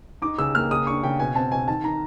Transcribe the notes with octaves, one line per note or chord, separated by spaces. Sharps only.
D#4 D6
C#3 E6
A#3 F6
C#3 D#6
D4 C#6
C#3 G5
B2 G#5
C4 A5
B2 G#5
D#3 A5
D#3 A#5